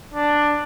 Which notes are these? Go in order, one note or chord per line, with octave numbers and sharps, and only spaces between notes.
D4